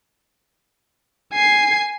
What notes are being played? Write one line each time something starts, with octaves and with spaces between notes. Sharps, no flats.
G#5 C7